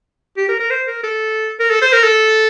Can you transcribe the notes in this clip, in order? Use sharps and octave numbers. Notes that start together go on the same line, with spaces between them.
G4
A#4
A#4
C5
A#4
A4
A#4
A4
C5
A#4
A4